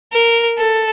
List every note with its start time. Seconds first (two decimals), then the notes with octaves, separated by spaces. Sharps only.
0.13 A#4
0.59 A4